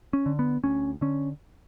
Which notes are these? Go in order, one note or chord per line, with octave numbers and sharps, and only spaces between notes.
C#4
D3
B3
D2 C#4
D3 C#4